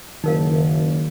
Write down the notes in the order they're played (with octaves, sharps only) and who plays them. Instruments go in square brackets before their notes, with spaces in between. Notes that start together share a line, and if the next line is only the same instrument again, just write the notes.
[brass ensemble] F#1 [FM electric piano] D#3 [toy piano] D#4 A#4 F5